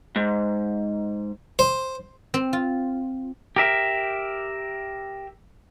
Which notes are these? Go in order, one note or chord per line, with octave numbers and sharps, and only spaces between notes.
G#2
C5
C4
F4
G4 A#4 E5